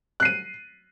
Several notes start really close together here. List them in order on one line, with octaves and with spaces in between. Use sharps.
F#6 C7 D#7